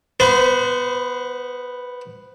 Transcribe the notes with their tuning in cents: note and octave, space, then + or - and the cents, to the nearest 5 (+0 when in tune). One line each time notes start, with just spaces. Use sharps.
B3 +0 C5 -30